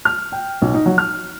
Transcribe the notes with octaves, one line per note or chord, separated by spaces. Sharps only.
F6
G5
B1
D#4
F#3
F6